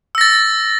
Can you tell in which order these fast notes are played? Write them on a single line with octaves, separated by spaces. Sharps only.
E6 A#6 A6